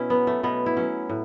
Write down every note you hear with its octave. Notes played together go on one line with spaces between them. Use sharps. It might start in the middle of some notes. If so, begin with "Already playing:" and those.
Already playing: B2 C#4 E4
F#3 B3
A3
B2 B3
E4
F#3 C#4
A2